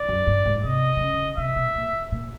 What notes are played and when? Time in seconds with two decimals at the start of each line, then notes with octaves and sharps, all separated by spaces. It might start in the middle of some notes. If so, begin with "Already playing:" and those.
Already playing: D5
0.09 F#2
0.27 G2
0.46 G#2
0.64 C3 D#5
0.97 C3
1.00 C#3
1.37 C3 E5
1.56 B2
1.75 A#2
2.12 A#2